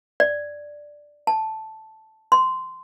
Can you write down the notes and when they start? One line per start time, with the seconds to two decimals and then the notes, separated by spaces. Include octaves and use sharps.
0.20 D5
1.27 A5
2.32 C6